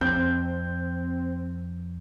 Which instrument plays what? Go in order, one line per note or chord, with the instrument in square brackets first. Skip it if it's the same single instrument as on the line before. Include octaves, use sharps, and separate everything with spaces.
[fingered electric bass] F2 [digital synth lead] C4 [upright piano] G6